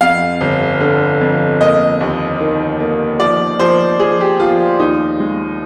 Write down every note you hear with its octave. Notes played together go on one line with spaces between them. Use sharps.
F2 F5
G1
D3
F2
A#3 D#5
D#2
D#3
A#3
F3 D5
F3 C5
F3 G#4
G4
F3 F4
D#2 D#4
G#3